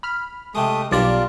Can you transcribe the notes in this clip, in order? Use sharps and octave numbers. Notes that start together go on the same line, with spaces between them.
B5 F6
C3 G#3 A3 D#6
B1 G2 D4 F4 A#4 D5